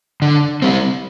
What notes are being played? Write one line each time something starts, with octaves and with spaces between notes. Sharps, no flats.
D3
G3 C4